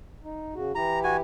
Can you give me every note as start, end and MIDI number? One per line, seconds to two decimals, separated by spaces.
0.24 0.54 63
0.55 0.72 49
0.55 0.72 66
0.75 1.21 52
0.75 1.21 64
0.75 1.21 67
0.75 0.99 82
1.04 1.17 66
1.04 1.17 80